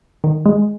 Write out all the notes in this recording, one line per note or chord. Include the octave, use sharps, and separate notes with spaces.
D#3
G#3